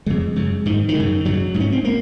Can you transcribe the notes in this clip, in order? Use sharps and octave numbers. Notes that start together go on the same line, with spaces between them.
F2 C#3 G#3
F#2 C#3
G#2 D#3
D#3
F#2 C#3
F#2 C#3 F#3
G#2
C#4
C4
A#3